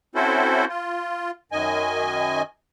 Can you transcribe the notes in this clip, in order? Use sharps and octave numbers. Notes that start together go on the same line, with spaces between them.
C4 C#4 E4 F#4 A4 C5
F4
F#2 D#3 D#5 G#5